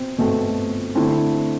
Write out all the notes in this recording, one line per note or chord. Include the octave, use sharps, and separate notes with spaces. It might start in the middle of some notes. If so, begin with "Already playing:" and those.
Already playing: B2 C4
B2 A3 C4
D3 A3 C4 E4